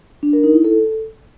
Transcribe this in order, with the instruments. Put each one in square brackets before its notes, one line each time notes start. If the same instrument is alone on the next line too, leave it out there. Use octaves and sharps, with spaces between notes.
[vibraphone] D4
A#4
D#4
E4
A4